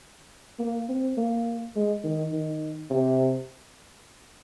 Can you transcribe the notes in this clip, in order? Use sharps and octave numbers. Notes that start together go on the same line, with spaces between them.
A#3
C4
A#3
G#3
D#3
D#3
C3